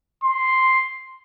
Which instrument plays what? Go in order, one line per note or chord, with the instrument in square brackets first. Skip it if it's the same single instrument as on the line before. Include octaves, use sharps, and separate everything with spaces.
[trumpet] C6